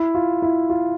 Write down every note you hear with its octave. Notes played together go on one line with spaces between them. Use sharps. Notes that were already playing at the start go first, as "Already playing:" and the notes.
Already playing: E4
F4
E4
F4